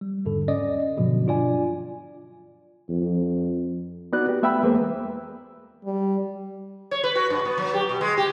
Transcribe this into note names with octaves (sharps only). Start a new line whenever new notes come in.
G3
E2 G#2 D3 A4
C#4 D5 D#5
G2 B2 D3 F3 F#3
D4 F4 D5 G#5
F2
B3 D#4 F#4 D5 F#6
G4
A3 B3 E5 G5 B5 E6
E2 G#3 A#3 G#4 B4 C5
G3
C#5
B4
F#4
G2
B3
F#3
G4
B2
G#3
G4